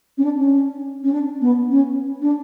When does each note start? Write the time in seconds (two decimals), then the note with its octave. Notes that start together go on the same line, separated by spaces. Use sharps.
0.18 C#4
0.24 D4
0.38 C#4
1.03 C#4
1.12 D4
1.41 B3
1.70 C#4
2.21 D4